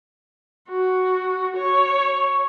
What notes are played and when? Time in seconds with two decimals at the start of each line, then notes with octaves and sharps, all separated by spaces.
0.69 F#4
1.57 C#5